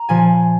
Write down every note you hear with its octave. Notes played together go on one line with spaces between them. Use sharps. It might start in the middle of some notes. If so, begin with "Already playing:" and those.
Already playing: A#5
A#2 F3 G#5